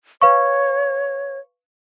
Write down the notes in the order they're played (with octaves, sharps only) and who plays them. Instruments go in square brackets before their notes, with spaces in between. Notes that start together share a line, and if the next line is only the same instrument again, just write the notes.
[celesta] B4 F5 C#6 [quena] C#5